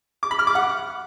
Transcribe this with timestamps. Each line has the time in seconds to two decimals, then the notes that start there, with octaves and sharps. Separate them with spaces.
0.23 D6
0.31 B5
0.39 F6
0.47 D6
0.55 F#5